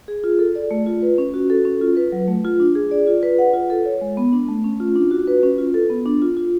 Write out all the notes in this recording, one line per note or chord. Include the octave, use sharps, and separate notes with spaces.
G#4
F4
A4
D5
A3
F4
B4
C#4
F#4
A4
C#4
F4
B4
F#3
A3
F4
D4
G#4
D5
F4
B4
F#5
F4
A4
C#5
G#3
B3
D4
A3
C#4
F4
D4
F#4
B4
C#4
F4
A4
B3
D4
F4
F4